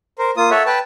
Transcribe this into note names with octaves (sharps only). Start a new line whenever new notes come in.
A#4 C5
A#3 F4 D#6
A4 C#5 E5 F#5
B4 G5 A5